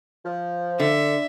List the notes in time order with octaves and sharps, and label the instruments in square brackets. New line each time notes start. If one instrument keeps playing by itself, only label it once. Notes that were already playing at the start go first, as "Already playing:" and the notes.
[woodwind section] F3
[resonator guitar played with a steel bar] D3 [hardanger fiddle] E5